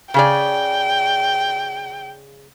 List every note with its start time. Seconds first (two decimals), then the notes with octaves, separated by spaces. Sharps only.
0.14 C#3 G#4 D5 G5